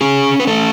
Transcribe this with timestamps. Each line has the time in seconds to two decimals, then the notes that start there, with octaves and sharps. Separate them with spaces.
0.01 C#4 G#4
0.40 B4
0.47 A3 A4